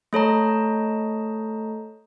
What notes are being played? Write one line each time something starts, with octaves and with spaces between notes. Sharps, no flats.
A3 A4 C#5 A#5